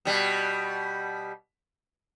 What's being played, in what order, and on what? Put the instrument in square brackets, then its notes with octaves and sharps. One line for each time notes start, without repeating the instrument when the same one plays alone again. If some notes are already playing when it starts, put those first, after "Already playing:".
[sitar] B2 G3